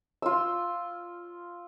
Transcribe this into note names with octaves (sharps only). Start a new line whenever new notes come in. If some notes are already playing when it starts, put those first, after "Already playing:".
F4 E6